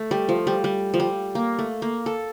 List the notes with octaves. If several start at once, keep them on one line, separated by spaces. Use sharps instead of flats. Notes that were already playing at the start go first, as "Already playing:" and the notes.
Already playing: A3
G3
F3
G3
G3
F3
G3
A#3
A3
A#3
A4